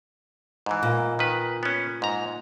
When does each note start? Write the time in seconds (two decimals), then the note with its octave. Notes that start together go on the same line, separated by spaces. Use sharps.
0.66 G#2 E3
0.83 A#2
1.19 D#3 B4
1.63 B3 C#4
2.02 G#2 A#5